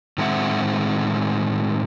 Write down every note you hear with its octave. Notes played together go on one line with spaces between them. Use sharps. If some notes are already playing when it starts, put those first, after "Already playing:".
A2 D#3 G#3 C4 E5 F#5